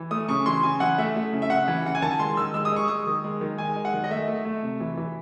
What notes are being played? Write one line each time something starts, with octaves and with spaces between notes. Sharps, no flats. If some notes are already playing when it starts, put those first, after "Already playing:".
Already playing: E3
A3 D#6
C#3 C#6
E3 C6
C#3 G#5
E3 F#5
A3 E5
A3
C#3
E5
C#3 F#5
E3
C#3 F#5
G#5
D#3 A5
G#3 C6
D#3 E6
G#3 E6
D#6
G#3 C#6
G#3 D#6
D#3
G#3
D#3
G#3 G#5
G#3
F#5
D#3
D#5
A3 E5
A3
A3
C3
E3
E3